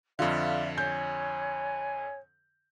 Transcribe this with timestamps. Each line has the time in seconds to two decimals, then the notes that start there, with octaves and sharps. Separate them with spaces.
0.19 F2 D3 F4 D5 E5 F5
0.78 C#5 G#5 G6